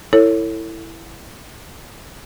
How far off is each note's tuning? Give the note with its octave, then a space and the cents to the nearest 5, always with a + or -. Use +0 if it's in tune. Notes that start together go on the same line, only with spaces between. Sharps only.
E4 +0 A4 +35 C#5 +0